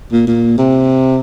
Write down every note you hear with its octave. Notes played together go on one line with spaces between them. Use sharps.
A#2
A#2
C3